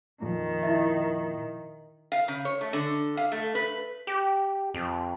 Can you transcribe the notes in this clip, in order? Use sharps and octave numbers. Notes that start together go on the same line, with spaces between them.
F2 A#2 D#3 F3
E4 E5
F5
C#3
C#5
A3
D3
F5
A3
B4
G4
F2